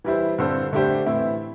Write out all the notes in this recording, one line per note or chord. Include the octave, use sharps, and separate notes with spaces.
E3 G3 E4 C5
G2 D3 C4 A4 C5
D3 A3 D4 G4 C5
A2 E3 C4 E4